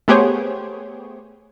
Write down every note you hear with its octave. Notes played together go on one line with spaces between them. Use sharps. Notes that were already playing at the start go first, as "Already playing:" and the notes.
A3 B3 G4 G#4 C5 C#5